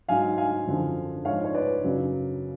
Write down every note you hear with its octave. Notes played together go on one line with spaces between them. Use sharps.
G#2 F#3 F5 G#5
F5 G#5
F#2 D3 F3
G#2 F3 C#5 F5
C#5
B4 D5
F#2 C#3 F#3